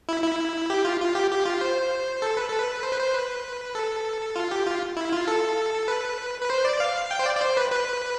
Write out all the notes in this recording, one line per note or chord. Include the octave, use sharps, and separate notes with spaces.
E4
E4
G4
F4
F4
G4
G4
F4
C5
A4
B4
A4
B4
C5
B4
C5
B4
A4
F4
G4
F4
E4
F4
A4
B4
B4
C5
D5
F5
G5
C5
D5
D5
C5
B4
B4